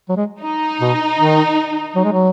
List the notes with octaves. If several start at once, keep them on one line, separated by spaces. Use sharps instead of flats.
F#3
G#3
D#4
B2
D#3
F#3
G#3
F#3